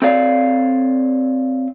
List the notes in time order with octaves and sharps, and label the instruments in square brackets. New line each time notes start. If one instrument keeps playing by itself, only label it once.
[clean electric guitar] C4 A4 C#5 D5 F5